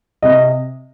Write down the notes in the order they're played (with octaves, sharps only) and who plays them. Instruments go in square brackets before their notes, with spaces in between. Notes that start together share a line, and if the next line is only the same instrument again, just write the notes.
[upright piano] C3 D#5